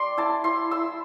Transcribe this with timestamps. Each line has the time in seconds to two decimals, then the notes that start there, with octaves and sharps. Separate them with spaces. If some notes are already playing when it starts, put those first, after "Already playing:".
Already playing: G3 D5 C6 D6
0.17 E4 A5
0.44 E4 C6
0.71 E4 E6